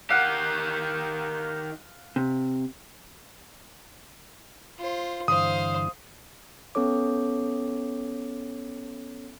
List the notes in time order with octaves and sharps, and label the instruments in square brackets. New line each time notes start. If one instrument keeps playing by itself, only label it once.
[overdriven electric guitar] D#3 G4 [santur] F5 F#5
[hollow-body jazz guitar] C3
[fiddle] F4 C5
[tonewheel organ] G2 D3 E3 [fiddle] C5 F5 [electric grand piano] D#6
[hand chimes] B3 C#4 A4 C#5 D6